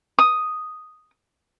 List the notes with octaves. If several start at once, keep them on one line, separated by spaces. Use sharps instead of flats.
D#6